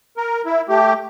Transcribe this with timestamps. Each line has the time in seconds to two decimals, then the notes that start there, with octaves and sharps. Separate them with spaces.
0.17 A#4
0.46 E4
0.69 A3 G4